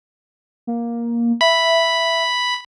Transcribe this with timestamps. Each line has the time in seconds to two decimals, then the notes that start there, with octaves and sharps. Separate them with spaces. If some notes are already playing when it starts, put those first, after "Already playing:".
0.67 A#3
1.41 E5 B5